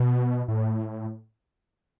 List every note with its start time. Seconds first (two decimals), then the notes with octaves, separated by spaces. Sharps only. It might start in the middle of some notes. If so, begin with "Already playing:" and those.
Already playing: B2
0.48 A2